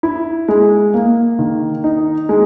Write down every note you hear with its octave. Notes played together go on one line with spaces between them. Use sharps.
E4
G#3
A#3
D#3
D#4
G#3